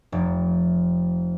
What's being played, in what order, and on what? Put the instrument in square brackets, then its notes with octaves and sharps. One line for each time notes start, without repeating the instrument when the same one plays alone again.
[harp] F1